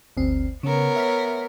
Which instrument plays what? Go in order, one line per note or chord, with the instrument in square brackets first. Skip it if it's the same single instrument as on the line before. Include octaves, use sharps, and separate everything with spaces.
[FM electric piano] G1 D2 C4
[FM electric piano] C#3 [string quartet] B3 A#4 C#5
[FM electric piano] E5 F6 B6